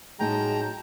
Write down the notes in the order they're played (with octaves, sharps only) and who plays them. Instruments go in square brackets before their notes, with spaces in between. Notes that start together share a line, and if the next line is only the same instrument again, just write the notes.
[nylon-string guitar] A2 F#3 D#4 [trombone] G#3 [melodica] G5 A#5 [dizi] A5